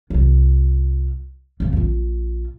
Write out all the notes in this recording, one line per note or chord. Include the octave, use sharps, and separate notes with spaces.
C2 F4
E2 G2
A#1 F4